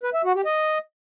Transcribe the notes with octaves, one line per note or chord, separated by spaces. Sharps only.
B4
E5
F#4
G4
D#5